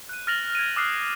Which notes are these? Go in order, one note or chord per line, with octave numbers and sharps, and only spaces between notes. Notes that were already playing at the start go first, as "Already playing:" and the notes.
F#6 D#7
F6 A6 A#6 F7 F#7
G#6 D7 D#7
D6 D#6 F6 F#6 C7